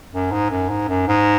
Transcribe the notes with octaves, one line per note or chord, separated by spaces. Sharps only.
F#2
G#2
F#2
G#2
F#2
G#2